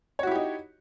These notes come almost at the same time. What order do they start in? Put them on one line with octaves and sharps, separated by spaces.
C#5 F#4 E4 G4 D#4